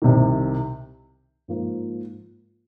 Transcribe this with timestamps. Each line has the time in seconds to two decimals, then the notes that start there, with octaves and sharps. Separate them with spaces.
0.02 C2 C3 D#3
1.48 G#2 F3 A#3 F4